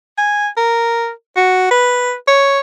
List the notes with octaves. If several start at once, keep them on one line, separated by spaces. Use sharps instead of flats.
G#5
A#4
F#4
B4
C#5